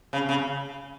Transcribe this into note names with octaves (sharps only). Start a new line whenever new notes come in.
C#3
C#3